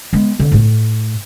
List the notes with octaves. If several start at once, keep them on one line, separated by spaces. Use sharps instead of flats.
G#3 B3
D3
A2 A3